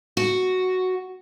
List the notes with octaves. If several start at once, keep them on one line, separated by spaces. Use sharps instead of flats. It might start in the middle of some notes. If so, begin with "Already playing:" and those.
F#4